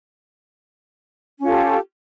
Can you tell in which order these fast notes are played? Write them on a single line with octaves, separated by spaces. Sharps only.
C#4 F4 A4 G4